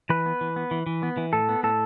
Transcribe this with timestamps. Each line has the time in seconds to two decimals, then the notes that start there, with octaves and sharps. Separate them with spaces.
0.10 E3 B4
0.26 B3
0.41 E3
0.56 B3
0.71 E3
0.86 E3
1.03 B3
1.17 E3
1.33 A2 A4
1.49 B3
1.63 A2 A4